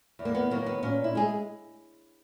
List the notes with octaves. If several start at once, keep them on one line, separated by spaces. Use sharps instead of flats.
E2
A#3
B3
D#3 F#3 A#3
B3
A#2 C#4
E4
G#3 G#4